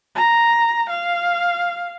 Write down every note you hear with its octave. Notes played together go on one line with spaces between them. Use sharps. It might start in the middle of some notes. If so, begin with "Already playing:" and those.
A#5
F5